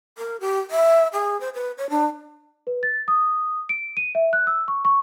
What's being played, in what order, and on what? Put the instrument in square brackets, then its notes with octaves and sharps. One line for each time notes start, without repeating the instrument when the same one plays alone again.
[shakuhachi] A#4
G4
E5
G#4
C5
B4
C#5
D4
[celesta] B4
A6
D#6
D7
D#7
E5
F#6
E6
C#6
C#6